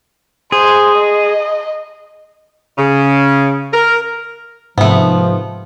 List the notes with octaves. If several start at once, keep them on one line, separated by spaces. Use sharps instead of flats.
G#4 C5
D#5
C#3
A#4
G#2 C3 F3 A3 B3